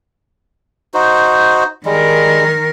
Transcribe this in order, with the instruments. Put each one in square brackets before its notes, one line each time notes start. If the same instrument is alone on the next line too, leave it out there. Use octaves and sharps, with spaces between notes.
[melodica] D#4 F#4 C5
[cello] D#3 A#4 [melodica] G3 G#3